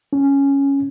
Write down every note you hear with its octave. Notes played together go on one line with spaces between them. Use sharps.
C#4